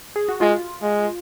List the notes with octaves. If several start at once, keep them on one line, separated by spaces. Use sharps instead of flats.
G#4
F#4
G#3 F4
G#3